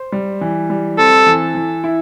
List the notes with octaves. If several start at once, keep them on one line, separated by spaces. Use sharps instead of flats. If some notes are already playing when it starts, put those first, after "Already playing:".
Already playing: C5
G3
E3
G3
C4 A4
E3
E3
E4